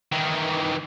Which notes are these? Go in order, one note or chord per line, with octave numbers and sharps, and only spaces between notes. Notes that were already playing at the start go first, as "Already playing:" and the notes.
D#3 E3